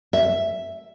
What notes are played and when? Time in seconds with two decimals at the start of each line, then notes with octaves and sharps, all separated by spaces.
0.13 E5